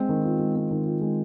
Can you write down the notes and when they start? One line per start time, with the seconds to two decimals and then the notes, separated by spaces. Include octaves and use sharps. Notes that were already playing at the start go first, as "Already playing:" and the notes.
Already playing: G#3 C4
0.09 D#3
0.24 F4
0.39 G#3
0.55 C4
0.71 D#3
0.86 F4
1.01 G#3